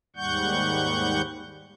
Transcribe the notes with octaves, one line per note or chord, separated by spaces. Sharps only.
D#2 G#2 G3 F#5 C#6 G6